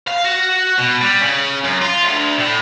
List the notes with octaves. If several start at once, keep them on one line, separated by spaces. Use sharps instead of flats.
F5
F#4
B2
G3
C#3
F#2
F4
D2
A2